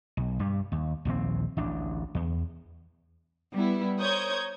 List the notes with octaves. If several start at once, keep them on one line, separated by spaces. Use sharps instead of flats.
B1
G2 G3
D#2
A#1 D#2 D3 C4
A1 D2 D4
E2
G3 B3 E4
A#4 C5 C#5 D#6 G6 G#6